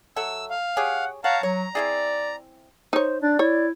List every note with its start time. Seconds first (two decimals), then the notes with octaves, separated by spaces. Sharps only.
0.16 F#3 A4 E5 E6
0.50 F5
0.77 G4 G#4 C#5 F#5
1.24 C#5 F5 F#5 A5 A#5
1.43 F#3 C#5 A#5
1.75 C4 E4 G#4 D5
2.93 D#4 C5 C#5
3.22 D4 D5
3.39 E4 C#5